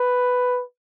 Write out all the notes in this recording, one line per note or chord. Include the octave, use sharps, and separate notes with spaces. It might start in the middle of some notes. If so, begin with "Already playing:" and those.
Already playing: B4